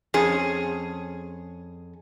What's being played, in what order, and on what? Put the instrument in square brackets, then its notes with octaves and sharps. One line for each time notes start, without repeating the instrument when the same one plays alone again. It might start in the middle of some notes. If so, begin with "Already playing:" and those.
[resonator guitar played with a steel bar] F2 C#4 G#4